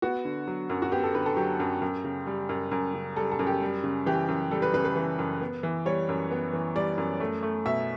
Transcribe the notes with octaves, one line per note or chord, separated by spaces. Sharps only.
B3 F#4
D3
F#3
F#2
F#4
B3 G4
A4
D3 B4
A4
F#3 G4
F#2
F#2
C#3
G3
F#2
F#2
C#3
G3 A4
A4
F#2
G4
G3
C#3
E3 G4
F#2
G3 A4
B4
C#3 B4
B4
E3
F#2
B3
E3
G3 C#5
F#2
B3
E3
G3 D5
F#2
A3
A3
B2 E5